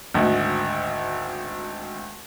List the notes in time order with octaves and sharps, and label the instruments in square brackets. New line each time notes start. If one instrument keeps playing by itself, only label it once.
[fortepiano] G#1 D2